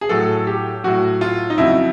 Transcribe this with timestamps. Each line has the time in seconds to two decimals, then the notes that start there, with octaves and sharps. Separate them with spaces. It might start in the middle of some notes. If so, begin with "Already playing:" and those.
0.01 G#4
0.09 A2 F#3 A4
0.47 G4
0.84 A2 F#3 F#4
1.21 F4
1.50 D#4
1.57 F2 C#3 F#3 E4